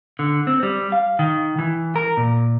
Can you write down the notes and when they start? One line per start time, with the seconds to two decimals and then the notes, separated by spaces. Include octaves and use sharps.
0.19 D3
0.47 C4
0.63 G3
0.92 F5
1.19 D#3
1.59 E3
1.96 A#4
2.17 A#2